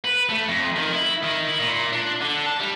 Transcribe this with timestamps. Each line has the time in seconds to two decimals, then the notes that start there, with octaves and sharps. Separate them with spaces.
0.05 B4
0.29 A3
0.48 F2
0.77 D#3
0.93 E4
1.23 D#3
1.46 E4
1.60 A#2
1.93 D4
2.21 D3
2.46 A5
2.60 G3